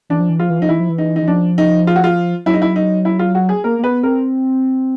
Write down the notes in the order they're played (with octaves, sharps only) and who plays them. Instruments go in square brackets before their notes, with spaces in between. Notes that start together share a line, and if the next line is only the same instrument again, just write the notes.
[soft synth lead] E3 [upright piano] D4
[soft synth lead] F3
E3
[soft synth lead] F3 [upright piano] F4
[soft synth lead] E3
[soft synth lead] F3 [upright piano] D#4
[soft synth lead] E3 [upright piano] E4
[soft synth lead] F3
E3
[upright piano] D#4
D#4
[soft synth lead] E3
[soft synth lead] F3 [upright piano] D4
[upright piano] D#4
F4
F#4
F4
[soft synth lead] F#3 [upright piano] E4
[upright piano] D#4
E4
D#4
E4
F4
F#4
G#4
[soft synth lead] A#3 [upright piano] A#4
[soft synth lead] A#3
[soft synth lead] B3 [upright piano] B4
[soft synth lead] C4 [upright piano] A#4